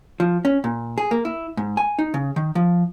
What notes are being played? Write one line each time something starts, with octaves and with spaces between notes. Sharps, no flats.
F3
C#4
A#2
G#4
A#3
E4
G#2
G#5
D#4
C#3
D#3
F3